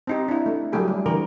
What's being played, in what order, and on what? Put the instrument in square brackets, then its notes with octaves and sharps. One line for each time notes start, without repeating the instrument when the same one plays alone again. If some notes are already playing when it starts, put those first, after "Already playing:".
[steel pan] C4 D#4 G4
D4 E4
A3
F#3 G3 A3 G4 G#4
G3
D3 E3 A#4